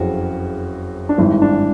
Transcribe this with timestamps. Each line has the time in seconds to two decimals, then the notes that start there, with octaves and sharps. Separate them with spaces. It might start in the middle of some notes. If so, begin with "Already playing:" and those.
Already playing: F#1 F2 C#3 E4 F#4
1.09 D4
1.18 G#1 G2 E3 D#4
1.42 D4